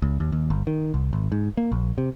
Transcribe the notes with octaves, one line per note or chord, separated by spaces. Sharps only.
C#2
D#2
D#2
G1
D#3
C2
G#1
G#2
A#3
A#1
C3